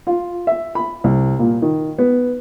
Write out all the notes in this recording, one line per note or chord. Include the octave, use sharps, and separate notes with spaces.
F4
E5
B5
C2
A#2
D#3
B3